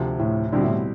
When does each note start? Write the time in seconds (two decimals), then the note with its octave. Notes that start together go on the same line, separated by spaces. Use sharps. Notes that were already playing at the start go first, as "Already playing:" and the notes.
Already playing: D2 C3 F3
0.19 A2
0.52 B2 D3 G3 C4 E4
0.63 A2